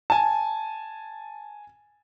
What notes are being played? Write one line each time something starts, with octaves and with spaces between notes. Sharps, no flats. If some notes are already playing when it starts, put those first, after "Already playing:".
G#5 A5